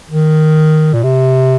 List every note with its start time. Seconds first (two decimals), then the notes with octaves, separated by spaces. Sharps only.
0.11 D#3
0.93 A#2
1.03 C3